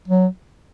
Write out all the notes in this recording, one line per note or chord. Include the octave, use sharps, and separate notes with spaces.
F#3